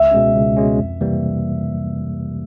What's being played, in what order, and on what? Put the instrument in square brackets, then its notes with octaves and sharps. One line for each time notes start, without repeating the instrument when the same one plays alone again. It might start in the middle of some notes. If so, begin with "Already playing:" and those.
Already playing: [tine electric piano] C#2 [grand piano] E5
[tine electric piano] B2 G#3 C#4
C#2
B2 G#3 C#4
F2
C3 E3 G3 A#3